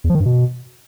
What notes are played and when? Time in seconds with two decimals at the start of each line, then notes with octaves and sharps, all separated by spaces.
0.04 E2
0.10 F3
0.15 D#3
0.20 G2
0.26 B2